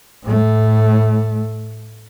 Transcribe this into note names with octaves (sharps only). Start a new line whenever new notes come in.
A2 A3